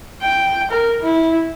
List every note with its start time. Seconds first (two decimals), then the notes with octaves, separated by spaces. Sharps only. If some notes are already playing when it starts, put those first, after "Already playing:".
0.22 G5
0.71 A#4
1.02 E4